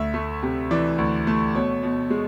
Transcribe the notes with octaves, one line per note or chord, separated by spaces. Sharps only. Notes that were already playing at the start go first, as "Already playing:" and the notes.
Already playing: D2 E5
A3
C3
E3 D5
D2
A3
B2 C#5
B2
G#3